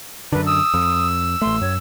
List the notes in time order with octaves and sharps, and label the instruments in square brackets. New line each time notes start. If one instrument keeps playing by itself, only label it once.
[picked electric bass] F#2 D3 [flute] B4
[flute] D#6 [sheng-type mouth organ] E6
[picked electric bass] F2
[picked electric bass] A1 A3 [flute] C6
[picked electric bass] F#2 [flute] C#5